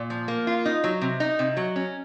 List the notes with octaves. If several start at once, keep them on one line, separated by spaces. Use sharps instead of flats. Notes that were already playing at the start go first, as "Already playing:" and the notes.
Already playing: A#2
F3
A#3
F4
D#4
F#3
C3
D#4
C3
F#3
C#4